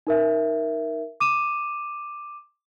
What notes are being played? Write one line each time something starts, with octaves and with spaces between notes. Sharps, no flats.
D#4 A#4 E5
D6 D#7 E7